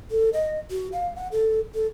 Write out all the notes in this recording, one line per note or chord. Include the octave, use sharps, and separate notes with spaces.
A4
D#5
F#4
F5
F#5
A4
A4